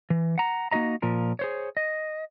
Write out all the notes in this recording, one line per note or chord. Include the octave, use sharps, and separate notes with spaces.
E3
F#5 A#5
A#3 D#4 F#4 D#5 A#5
A#2 F3 A#4
G#4 C5 C#5
D#5